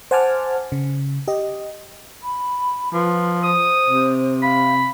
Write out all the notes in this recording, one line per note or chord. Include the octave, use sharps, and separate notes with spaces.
C5 F#5 G#5 A5 D6 F6
C#3
G4 D#5
B5
F3 B4
C5 D#6
C3
F5 B5